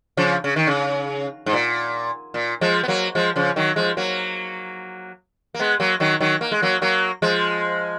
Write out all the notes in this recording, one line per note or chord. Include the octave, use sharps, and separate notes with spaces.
C#3 F3
C#3
D#3
C#3
G#2
A#2
A#2
F3 G#3
B3
F#3 A#3
F3 G#3
C#3 F3
D#3 F#3
F3 G#3
F#3 A#3
A#3
G#3 B3
F#3 A#3
D#3 F#3
D#3 F#3
A#3
G#3
F#3 A#3
F#3 A#3
F3 G#3